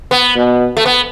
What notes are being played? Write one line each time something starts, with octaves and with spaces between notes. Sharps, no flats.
B3
B2
A3
B3